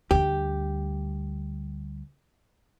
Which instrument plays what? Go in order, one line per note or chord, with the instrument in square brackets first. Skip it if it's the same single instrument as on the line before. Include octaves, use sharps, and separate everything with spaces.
[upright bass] D2 G3 [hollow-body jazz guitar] G4